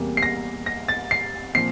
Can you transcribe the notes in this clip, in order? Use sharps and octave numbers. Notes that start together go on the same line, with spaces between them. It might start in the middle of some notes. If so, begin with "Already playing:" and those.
Already playing: E2 C3 G3 A#3
C7
A#6
A#6
A6
C7
A#2 F3 C4 C7